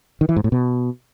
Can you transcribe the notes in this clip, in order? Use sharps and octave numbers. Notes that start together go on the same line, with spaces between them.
D#3
E3
G#2
A2
B2